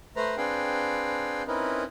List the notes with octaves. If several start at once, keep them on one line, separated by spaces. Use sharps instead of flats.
A3 B4 C5 A#5
C4 D4 G#4 B4 F5 G5
C4 C#4 D#4 E4 A#4 B4